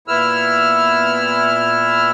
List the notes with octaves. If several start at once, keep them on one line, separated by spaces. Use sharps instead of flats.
A#2 B3 E4 E6 F6